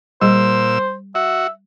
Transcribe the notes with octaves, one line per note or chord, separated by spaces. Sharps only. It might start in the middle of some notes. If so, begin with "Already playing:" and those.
A#2 G3 G#4 C5 E6
F#4 E5